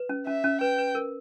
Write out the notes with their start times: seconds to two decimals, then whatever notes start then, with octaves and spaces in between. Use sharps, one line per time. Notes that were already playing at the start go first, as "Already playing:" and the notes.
Already playing: B4
0.09 C#4
0.27 C#4 E5
0.44 C#4
0.61 B4 G5
0.78 B4
0.95 A#4